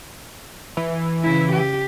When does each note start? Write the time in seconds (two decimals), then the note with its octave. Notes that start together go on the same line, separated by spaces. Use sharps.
0.77 E3
1.23 C#3 E4
1.52 G4